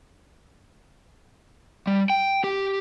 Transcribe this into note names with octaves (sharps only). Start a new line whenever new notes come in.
G3
G5
G4